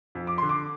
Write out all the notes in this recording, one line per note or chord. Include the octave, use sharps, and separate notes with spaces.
F2
D6
D3 C6
D6